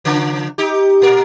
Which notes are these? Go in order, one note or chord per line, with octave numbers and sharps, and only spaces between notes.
C#3 F3 D4
D#4 G4
A#2 A#4